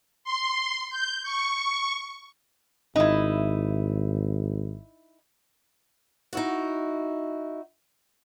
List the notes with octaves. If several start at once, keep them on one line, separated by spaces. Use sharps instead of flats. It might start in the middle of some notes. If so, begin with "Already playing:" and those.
C6
G6
C#6
G#1 D#4 E4
D#4 E4 F#4